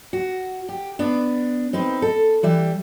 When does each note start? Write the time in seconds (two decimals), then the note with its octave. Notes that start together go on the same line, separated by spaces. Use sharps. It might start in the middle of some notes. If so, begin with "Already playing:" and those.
0.13 F#4
0.69 G4
0.99 B3 D4
1.73 C4 D#4 B4
2.02 A4
2.43 E3 G3 E5